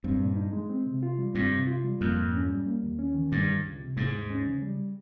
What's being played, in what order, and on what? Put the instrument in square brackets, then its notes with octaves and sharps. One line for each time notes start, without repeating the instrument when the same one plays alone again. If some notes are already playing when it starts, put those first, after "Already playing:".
[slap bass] G2 [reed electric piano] C4
[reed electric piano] A#2
D#4
G#3
C4
C3
F4
G3
[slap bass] G2 [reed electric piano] C4
[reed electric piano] C3
F4
G3
[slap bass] F2 [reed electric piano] A#3
[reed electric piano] G#2
C#4
G3
A#3
D#2
C#4
D#3
[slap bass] G2 [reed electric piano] G3
[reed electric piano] C#2
C#2
C3
[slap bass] G#2 [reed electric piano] G#3
[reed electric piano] D#2
C#4
C#3
G3